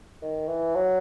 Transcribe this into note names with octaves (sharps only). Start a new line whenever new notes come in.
D#3
E3
F#3